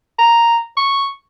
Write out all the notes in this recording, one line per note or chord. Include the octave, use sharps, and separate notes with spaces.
A#5
C#6